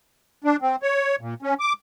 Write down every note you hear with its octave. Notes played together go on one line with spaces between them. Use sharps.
D4
C4
C#5
A#2
C#4
D6